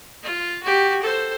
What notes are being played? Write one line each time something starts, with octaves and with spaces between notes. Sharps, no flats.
F4
F#4 G4
A4 C5